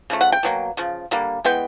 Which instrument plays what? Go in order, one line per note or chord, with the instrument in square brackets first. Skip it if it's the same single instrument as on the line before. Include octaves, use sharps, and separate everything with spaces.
[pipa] C#3 F3 A3
F#5
G5
B2 F#3 A#3
C#3 F3
D3 G3 A#3
E3 G#3 B3 G5